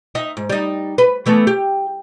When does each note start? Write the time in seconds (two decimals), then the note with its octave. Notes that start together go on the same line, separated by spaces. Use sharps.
0.15 D#4 E5
0.37 G#2
0.50 G3 D#4
0.98 B4
1.26 E3 A3 B3
1.47 G4